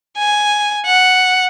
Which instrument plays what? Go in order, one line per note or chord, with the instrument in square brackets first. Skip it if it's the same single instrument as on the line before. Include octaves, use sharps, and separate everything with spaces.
[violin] G#5
F#5